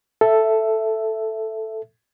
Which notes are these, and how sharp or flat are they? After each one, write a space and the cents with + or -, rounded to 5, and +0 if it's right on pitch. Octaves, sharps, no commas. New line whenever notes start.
A4 +0 E5 +10